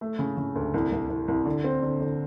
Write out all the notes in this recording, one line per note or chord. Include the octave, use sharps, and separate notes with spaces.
A3
C#3
C#3
D2
C2
C2
C2
C2
D3
C4
D3
D3